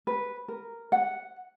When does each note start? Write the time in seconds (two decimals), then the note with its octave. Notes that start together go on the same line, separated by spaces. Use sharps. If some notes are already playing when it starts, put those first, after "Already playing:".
0.07 B4
0.48 A#4
0.92 F#5